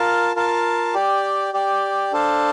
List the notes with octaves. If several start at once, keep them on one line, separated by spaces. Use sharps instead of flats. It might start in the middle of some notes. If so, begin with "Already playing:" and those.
Already playing: F4 A#4 F5 A5
F4 A#4 F5 A5
G4 D5 G5
G4 D5 G5
D4 A4 C5 F5 A5